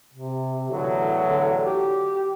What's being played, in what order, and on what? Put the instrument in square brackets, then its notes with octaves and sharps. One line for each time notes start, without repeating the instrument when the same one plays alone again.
[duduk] C3
[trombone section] E2 A2 F#3 [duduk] D3
[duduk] D3
G4